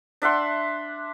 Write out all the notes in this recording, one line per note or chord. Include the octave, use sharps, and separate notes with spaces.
D4 E5 F#5 C6